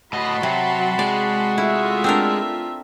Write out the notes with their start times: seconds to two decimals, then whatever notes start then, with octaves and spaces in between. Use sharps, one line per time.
0.13 A2 F#4 D#5 A5 B5 C6
0.43 C3 F#3
0.99 G#3 D5
1.58 A3 E4 F4 E5
2.04 C4 D4 A#4